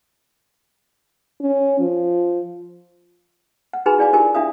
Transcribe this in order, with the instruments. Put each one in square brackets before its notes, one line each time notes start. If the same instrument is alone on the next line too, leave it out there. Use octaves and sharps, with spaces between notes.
[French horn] C#4
F3
[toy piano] F#5
D#4 F#4 G#4 B4 G#5 B5
E4 G#4 D5 F5 G#5 D6
D#4 F4 G4 A#4 G#5 D6
D4 E4 E5 F5 D#6